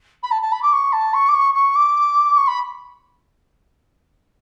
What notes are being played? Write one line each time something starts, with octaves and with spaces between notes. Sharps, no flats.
B5
A5
A5
B5
D6
C#6
A5
C#6
D6
C#6
C#6
D6
C#6
B5